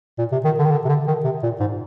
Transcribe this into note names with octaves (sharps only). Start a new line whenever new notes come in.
A#2
C3
D#3
D3
D#3
D3
C3
D3
D#3
C3
A#2
G#2